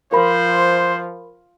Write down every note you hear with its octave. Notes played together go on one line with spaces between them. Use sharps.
F3 A#4 C5 B5